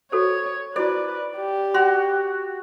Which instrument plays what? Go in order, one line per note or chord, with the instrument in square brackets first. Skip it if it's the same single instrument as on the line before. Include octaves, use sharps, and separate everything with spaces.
[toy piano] F#4 A4 C5 [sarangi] C#5
[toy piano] E4 F#4 C5 [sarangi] B4 [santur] D5
[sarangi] G4
[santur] F#4 [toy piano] C6